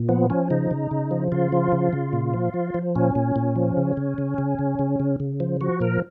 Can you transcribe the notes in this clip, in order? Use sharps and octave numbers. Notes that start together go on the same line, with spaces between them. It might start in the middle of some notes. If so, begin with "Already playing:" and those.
Already playing: A#2
F3 B3
F3 C#4
C#3 D#4
C#3
C#3
F3
C#3 F4
F3
C#3
C#3
A#2
F3
F3
F3
A#2 C#4
A#2
A#2
F3
C#3
C#3
C#3
C#3
C#3
C#3
C#3
C#3
F3
F3 F#4
A#2 A#4